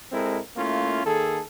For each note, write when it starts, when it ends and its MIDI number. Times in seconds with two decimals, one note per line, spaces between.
0.12 0.39 56
0.12 0.39 60
0.12 0.39 64
0.12 0.39 69
0.12 0.39 70
0.56 1.03 57
0.56 1.03 58
0.56 1.03 61
0.56 1.03 64
0.56 1.03 65
1.05 1.42 51
1.05 1.42 58
1.05 1.42 68
1.05 1.42 69